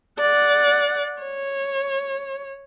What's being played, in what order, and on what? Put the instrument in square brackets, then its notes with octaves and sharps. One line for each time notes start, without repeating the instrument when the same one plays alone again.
[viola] D5 F#5
C#5